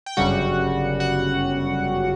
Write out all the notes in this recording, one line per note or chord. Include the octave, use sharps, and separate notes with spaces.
G5
G1 F#2 C#3 G3 F#4 F#5
F#4 F#5